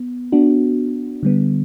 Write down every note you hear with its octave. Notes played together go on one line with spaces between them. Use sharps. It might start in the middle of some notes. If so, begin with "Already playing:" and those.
Already playing: B3
B3 D4 F#4
D3 G3 B3